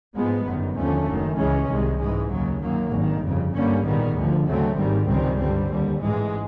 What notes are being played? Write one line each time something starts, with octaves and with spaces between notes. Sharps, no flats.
G#2 F3 G#3 B3
G1 F#2 D#3
D#2 D3 F3 A3 C#4
F#1 F#2 D#3
C#2 C#3 E3 G#3 C#4
C2 C3 D#3 G#3
G#2 E3 G#3
D#2 C#3 F#3
F#2 D#3 F#3 A#3
G#1 G2 D#3
G1 F2 C#3
G2 D3 G3 A#3 C#4
A#1 G#2 D#3 G3 B3
D2 D3 F3
D2 C#3 F#3 A3 C4
G#1 G#2 D#3 G3
C#2 C3 D#3 G3 C4
G2 D3 G3 C4
D#2 D3 G3
A1 G#2 E3 G#3